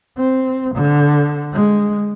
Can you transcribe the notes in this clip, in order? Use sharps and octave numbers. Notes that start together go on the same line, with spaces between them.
C4
D3
G#3